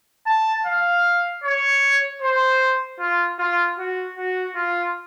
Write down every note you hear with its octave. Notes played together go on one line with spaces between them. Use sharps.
A5
F5
C#5
C5
F4
F4
F#4
F#4
F4